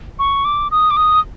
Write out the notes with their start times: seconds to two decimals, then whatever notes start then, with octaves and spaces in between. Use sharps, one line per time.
0.19 C#6
0.45 D6
0.71 D#6
0.91 D6
0.97 D#6